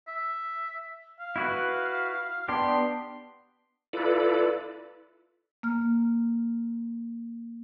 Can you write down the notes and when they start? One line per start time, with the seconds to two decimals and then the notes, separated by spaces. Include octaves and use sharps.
0.08 E5
1.20 F5
1.36 E4 F#4 B4
2.48 B3 D4 G4 C6
3.93 E4 F4 A4 B4 D5
5.63 A#3 F6